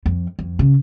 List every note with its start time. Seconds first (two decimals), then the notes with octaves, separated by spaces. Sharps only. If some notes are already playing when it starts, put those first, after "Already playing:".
0.06 F2
0.39 F2
0.59 C#3